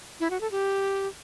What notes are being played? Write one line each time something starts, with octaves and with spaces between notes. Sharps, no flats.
E4
F#4
A4
G4